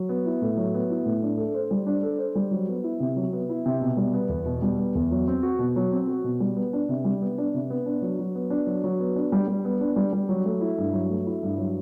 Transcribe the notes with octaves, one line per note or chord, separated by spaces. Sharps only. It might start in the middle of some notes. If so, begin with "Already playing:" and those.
Already playing: F#3
B3
E4
A2
F#3
B3
E4
A2
D4
A4
C5
G3
D4
A4
C5
G3
F#3
B3
E4
C3
F#3
B3
E4
C3
B2
G3
B3
E2
B2
G3
B3
E2
F#3
C4
F#4
B2
F#3
C4
F#4
B2
G3
B3
D4
C3
G3
B3
D4
C3
B3
D4
F#3
F#3
B3
D4
F#3
F#3
B3
D4
G3
G3
B3
D4
G3
G3
F#3
A3
E4
G2
F#3
A3
E4
G2
F#3